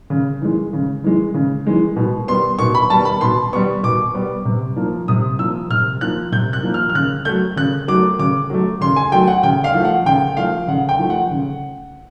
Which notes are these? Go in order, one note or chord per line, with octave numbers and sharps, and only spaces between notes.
C#3
E3 G#3
C#3
E3 G#3
C#3
E3 G#3
B2
G3 B3 C6
B2 C#6
B5
G3 B3 A5
B5
B2 C6
G3 B3 C#6
B2 D6
G3 B3
C3
F3 A#3
C3 D#6
F3 A#3 E6
C3 F6
F3 A#3 F#6
C3 G6
F#6
F3 A#3
F6
F6
C#3 F#6
F#3 A3 G6
C#3 F#6
F#3 A3 D6
C#3 D6
F#3 A3
C#3 C6
G#5
F#3 A3 G5
F#5
C#3 G5
F5
F3 A3
F#5
C#3 G5
F3 A3 F5
C#3 F#5
G5
F3 A3
F#5
C#3